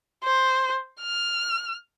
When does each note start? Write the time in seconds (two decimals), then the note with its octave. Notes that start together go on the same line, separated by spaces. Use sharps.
0.24 C5
1.02 F6